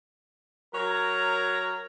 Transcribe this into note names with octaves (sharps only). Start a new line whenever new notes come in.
F#3 A#4 C#5 A#5